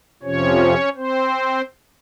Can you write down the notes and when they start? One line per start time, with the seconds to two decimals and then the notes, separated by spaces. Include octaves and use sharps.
0.23 F2 C3 F3 C#4 C#5
0.96 C4 C5